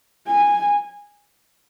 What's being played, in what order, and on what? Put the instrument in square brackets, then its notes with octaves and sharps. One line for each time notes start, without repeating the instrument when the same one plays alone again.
[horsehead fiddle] G#5